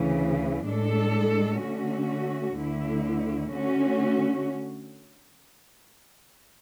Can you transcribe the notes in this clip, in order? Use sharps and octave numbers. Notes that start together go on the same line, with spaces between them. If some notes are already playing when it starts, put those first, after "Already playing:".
Already playing: D2 C#3 E3
A2 G#3 D4 A4
D3 A3 C#4 F#4
D2 D3 A3 E4
D3 A3 C#4 F#4